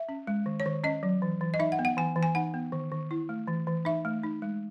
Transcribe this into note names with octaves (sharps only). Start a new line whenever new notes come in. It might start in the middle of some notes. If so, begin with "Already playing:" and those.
Already playing: E5
C#4
G#3
D#3
C#5
D#3
C#4 D#5
F#3
E3
E3
D#5
D#4 E5
F#5
B3
F#5
E3 G#5
E3
G#5
D#4 F#5
B3
D#3
D#3
E4
A3
E3
E3
D#4 E5
A3
D#4
G#3